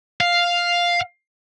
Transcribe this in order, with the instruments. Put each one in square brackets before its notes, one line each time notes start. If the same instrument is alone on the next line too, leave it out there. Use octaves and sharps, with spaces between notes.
[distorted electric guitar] F5